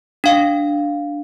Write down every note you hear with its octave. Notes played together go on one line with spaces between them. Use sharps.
D4 F5